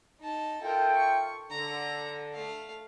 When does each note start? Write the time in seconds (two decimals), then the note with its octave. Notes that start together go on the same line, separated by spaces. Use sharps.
0.21 D#4 A5
0.62 F4 A4 A#4 E5 G5
0.96 C#6
1.51 D3 A#5
2.34 A3 F5